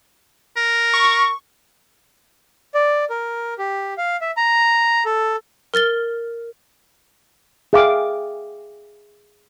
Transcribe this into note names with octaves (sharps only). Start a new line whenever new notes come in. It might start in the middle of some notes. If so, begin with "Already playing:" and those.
A#4
C#6
D5
A#4
G4
F5
E5
A#5
A4
A#4 F6 A6 G7
G#4 E5 F5 G5 D6